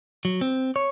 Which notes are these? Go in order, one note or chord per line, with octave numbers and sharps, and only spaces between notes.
F#3
C4
C#5